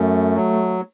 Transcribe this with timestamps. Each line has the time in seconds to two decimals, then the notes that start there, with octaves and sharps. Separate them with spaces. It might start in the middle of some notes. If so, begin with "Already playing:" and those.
Already playing: F#2 A3
0.36 F#3